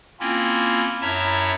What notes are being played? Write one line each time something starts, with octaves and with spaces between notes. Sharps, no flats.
A#3 C4 C#4 E4 F4
F#2 E4 C#5 E5 A5 A#5